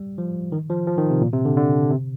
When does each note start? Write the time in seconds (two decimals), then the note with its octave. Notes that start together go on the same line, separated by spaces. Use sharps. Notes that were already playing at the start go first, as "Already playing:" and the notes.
Already playing: G3
0.18 F3
0.52 D#3
0.70 F3
0.87 F3
0.98 D#3
1.10 C3
1.21 A#2
1.33 C3
1.45 D3
1.57 D3
1.90 C3